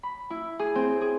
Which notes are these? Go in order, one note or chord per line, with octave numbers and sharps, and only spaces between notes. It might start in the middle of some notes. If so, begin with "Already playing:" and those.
B5
E4
G#4
C4
G#4